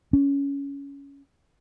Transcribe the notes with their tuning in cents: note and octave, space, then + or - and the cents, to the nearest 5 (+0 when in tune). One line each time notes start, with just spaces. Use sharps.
C#4 +15